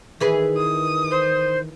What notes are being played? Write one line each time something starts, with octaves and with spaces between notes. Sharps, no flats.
D#3 E3 G#4 B4
D#6
C5